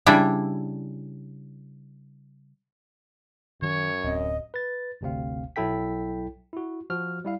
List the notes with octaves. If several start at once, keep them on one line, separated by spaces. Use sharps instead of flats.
C#3 G3 D4 E4
F#2 D#3 C#5
D1 C4 D#5
B4 A6
G1 D2 C3 C4 F5
B1 F#3 E4 A4 G5 B6
E4 F#4
F3 F#4 F6
G3 E4 F5